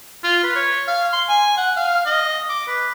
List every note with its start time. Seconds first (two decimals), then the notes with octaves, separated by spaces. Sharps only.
0.24 F4
0.44 B4
0.56 C#5
0.88 F5
1.13 C6
1.29 G#5
1.57 F#5
1.77 F5
2.06 D#5
2.49 D6
2.68 B4